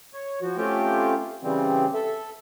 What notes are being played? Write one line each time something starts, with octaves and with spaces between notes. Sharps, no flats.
C#5
F3 F#4
A3 C4 C#4 F4 G4 G5
C#3 E3 G3 C4
A4 E5